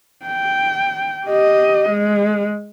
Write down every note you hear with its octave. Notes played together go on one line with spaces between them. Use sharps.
G5
G4 D#5
G#3